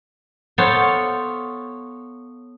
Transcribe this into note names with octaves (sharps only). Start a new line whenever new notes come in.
B3 A4 C5 C#5 F5